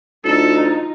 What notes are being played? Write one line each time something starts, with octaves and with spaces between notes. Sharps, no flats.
D2 D#4 F4 A4